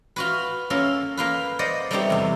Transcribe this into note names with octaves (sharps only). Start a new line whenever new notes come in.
F4 F#4 B4
A#3 C#4 F4 A4
A#3 F4 B4
C5 D5 D#5 F#5
G3 A3 B3 C4 D#4 G4
E2 C3